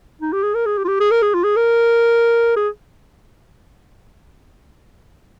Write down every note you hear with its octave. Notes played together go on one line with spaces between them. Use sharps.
D#4
G4
G#4
A#4
G#4
G4
F4
G4
G#4
A#4
G#4
F4
G#4
A#4
G#4